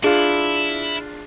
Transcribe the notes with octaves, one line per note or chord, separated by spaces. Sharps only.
D4 E4 F4 G#4